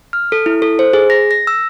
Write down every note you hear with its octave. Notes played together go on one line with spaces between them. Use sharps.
F6
A4
E4
A4
C5
G#4
A#6
A#6
E6